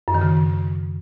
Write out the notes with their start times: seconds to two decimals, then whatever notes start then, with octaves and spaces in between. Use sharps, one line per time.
0.08 F#2
0.14 D#3
0.21 C#3